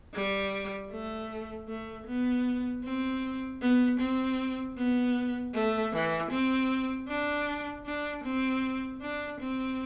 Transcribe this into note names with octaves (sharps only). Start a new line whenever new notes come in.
G3
A3
A3
B3
C4
B3
C4
B3
A3
E3
C4
D4
D4
C4
D4
C4